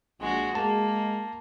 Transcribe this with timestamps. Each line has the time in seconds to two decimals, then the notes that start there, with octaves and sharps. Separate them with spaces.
0.20 A#1 G#3 F#4
0.55 G#3 A#3 A5